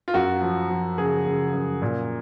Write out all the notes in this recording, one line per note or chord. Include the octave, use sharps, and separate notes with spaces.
F4
F#2 F#4
F3
F3
C#3 G#4
C#3
F#2
A#2